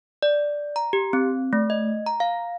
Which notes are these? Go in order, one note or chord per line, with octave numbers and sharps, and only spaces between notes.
D5
A#5
G4
C4
A3
D#5
A#5
F5